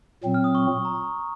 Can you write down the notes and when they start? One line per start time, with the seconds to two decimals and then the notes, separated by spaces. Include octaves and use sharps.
0.23 A#2 F#3 C4
0.34 F6
0.44 D#6
0.55 C#6
0.85 A#5